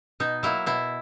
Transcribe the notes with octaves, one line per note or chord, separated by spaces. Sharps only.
B2 D#4
F#3 A#3 E4
B2 E4